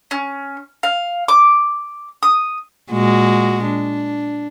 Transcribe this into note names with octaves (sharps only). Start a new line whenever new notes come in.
C#4
F5
D6
D#6
A#2 G#3 F#4
D4